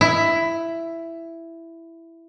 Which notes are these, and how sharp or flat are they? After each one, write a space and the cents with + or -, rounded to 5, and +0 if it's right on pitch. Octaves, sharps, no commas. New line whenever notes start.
E4 +10